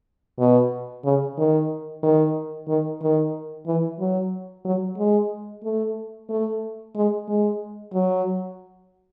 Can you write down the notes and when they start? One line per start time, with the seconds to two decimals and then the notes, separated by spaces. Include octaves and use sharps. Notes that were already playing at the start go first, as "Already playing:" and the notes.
0.39 B2
1.05 C#3
1.38 D#3
2.03 D#3
2.68 D#3
3.02 D#3
3.67 E3
3.99 F#3
4.65 F#3
4.98 G#3
5.64 A3
6.29 A3
6.96 G#3
7.28 G#3
7.94 F#3